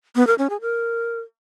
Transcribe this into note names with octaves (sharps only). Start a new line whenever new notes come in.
B3
A#4
C#4
G#4
A#4